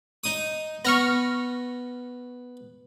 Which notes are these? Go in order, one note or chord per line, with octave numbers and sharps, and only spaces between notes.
D#4 D#6
B3 C#6 F6 A#6